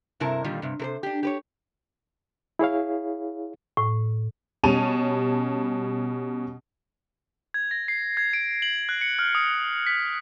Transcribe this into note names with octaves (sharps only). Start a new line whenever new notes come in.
G2 C3 E4 A#4 A5
A#2 D3 D#3 G3 F4
G2 C3
C3 A#4 C5
D4 G4
G4 B4 C#5
E4 G#4 C#5 F5
A2
B2 G3 C#4 A5 D#7 F7
G#6
A#6
C7
G#6
D7
F#7
F#6
C#7
F6
D#6
B6